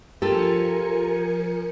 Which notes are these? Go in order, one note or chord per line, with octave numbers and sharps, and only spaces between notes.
F3 F4 G4 A4 A#4 G#5 C#7